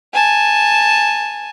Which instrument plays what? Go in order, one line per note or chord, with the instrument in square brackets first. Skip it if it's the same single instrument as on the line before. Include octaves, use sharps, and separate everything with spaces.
[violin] G#5 A5